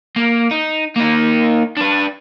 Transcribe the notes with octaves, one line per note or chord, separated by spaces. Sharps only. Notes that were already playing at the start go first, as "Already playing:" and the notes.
A#3
D#4
A#3 D#4
D4 B4